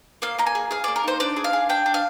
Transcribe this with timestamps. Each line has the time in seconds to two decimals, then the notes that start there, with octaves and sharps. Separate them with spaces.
0.22 A#3 F5
0.38 A#3 A#5
0.47 G#5
0.55 G#4
0.71 G#4 F5
0.84 A#3 D5
0.96 A#4
1.03 D#4 C5
1.20 D4 D5
1.36 G#4
1.44 F5
1.53 G#4
1.69 D4 G5
1.86 D4
1.94 F5